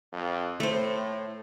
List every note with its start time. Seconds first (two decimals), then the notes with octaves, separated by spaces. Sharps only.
0.13 F2
0.60 A2 A3 C5